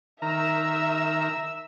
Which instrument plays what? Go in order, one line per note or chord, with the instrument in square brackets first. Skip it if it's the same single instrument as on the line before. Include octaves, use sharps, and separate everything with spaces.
[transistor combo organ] D#3 A#4 A#5 [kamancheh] E5 E6